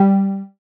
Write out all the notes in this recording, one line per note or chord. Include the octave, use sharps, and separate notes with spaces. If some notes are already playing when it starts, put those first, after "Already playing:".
Already playing: G3